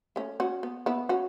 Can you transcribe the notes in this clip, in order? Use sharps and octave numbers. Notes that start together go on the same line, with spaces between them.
A3 C#4
C#4 F#4
B3
B3 E4
C#4 F#4